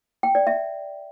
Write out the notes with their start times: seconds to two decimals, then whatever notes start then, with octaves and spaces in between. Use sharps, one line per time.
0.23 G5
0.35 D5
0.47 E5